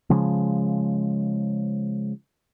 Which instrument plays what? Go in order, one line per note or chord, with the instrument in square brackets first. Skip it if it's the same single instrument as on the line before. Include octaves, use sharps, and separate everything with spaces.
[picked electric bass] C#3 F3 G#3